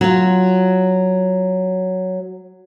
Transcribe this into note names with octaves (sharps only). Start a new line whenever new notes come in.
F#3 F4